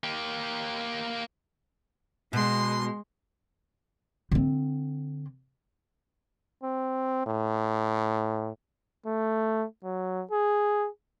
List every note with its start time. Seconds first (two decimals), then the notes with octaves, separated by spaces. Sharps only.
0.04 A#3 G4
2.33 B2 G#3 C6
4.32 D3 C4
6.63 C4
7.26 A2
9.06 A3
9.84 F#3
10.31 G#4